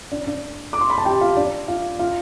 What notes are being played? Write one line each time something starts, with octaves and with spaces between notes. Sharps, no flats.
D4 D5
D4 D5
D6
C6
B5
A5
G4 G5
F4 F5
D4 D5
F4 F5
F4 F5